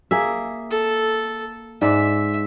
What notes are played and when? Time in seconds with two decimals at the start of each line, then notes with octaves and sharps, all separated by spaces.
0.11 A#3 G#4 E5
0.70 A4
1.82 G#2 D5 E5